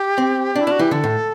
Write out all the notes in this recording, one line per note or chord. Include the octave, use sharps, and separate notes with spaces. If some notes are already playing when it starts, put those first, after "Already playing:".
Already playing: G4
C4
D4
E4
D4 F#4
E3 G4
D3 A4
A2